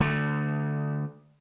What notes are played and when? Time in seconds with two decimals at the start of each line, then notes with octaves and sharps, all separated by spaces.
0.01 D3 A3